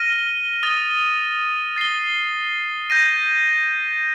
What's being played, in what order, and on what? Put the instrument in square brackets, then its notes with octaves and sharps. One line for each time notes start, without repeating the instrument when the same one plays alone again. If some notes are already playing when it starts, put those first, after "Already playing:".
Already playing: [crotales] F6 A#6 D#7 G7
D#6 A6 D#7 G7
A6 C7 G7
G6 A#6 D#7